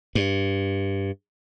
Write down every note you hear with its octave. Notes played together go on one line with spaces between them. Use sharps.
G2